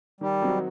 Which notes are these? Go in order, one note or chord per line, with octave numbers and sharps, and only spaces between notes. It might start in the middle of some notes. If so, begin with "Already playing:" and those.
D#3 G3
F#3 C4 D#4 F#4